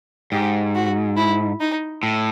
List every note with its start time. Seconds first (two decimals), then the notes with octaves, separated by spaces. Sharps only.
0.32 G#2 G4
0.75 F#4
1.17 E4
1.60 D#4
2.03 A2